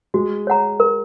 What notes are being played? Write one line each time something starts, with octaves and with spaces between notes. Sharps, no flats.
G#3 F#4
C#5 F#5 A#5
A#4